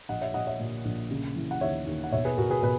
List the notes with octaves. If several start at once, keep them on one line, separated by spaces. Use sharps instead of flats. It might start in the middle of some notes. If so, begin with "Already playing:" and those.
A#1 D#5 F#5
C#5 E5
A#1 D#5 F#5
C#5 E5
A#2
A#1
C#3
E3
F#5
D#2 C#5 E5
D#2
F#5
B2 C#5 E5
G#4 B4
B2 F#4 A#4
G#4 B4
B2 G#4 B4